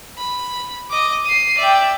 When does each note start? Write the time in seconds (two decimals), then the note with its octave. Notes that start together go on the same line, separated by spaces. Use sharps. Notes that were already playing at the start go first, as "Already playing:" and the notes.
0.18 B5
0.90 D#5 D6
1.25 C7 D#7
1.58 D5 E5 G5